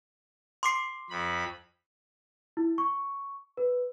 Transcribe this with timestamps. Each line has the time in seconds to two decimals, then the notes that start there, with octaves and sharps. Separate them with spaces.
0.63 C6 D6 C7
1.10 F2 B5
2.57 E4
2.78 C#6
3.57 B4